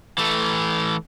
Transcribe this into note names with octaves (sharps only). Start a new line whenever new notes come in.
E3 A3